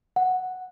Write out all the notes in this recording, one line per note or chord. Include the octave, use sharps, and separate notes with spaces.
F#5